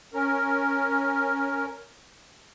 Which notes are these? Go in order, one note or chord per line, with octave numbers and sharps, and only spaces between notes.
C#4 A#4